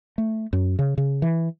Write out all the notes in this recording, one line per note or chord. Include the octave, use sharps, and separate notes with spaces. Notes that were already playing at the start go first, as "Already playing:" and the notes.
A3
F#2
C#3
C#3
E3